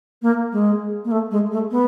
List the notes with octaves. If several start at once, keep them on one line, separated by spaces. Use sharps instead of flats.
A#3
G#3
A#3
A3
G#3
A3
B3